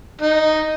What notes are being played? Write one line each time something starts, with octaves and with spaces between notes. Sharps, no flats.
D#4